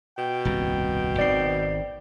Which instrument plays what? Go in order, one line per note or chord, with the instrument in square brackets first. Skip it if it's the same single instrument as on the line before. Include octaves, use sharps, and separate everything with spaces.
[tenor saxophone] B2 [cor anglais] G5
[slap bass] D#1 C2 G2
[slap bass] G#1 D#3 C4 [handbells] D5 C7